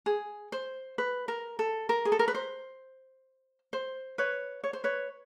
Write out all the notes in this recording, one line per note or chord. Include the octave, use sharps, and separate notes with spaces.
G#4
C5
B4
A#4
A4
A#4
G#4
A4
A#4
B4
C5
C5
B4 C#5
C#5
C5
B4 C#5